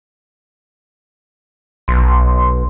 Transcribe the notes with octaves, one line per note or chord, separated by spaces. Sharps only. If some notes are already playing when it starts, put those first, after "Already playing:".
B1 C6